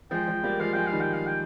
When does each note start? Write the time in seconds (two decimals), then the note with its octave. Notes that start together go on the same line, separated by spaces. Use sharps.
0.11 F3 G#3 G5
0.28 F3 G#3
0.43 G3 A#3
0.59 F3 G#3 F5
0.73 F3 G#3 G5
0.86 F5
0.92 D#3 G3
1.00 G5
1.13 F5
1.26 G5